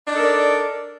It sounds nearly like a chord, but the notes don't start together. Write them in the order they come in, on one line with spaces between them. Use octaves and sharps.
D4 D#4 A4 A#4 D5